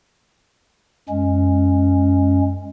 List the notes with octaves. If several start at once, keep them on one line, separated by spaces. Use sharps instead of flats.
F#2 G#3 C#4